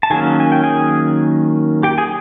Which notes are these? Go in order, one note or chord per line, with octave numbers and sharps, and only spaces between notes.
A5
D#3 F#3 A#3 C#4 G#4 G#5
G#5
G5
G#4 G#5
G4 G5
G#4 G#5